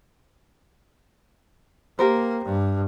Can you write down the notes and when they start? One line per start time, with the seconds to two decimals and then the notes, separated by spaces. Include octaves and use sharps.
1.99 A#3 G4 A#4 C5
2.45 G2